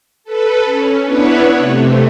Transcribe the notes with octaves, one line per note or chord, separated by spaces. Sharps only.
A4 B4
C#4
B3 D4 E4 B4 C#5
C3 A3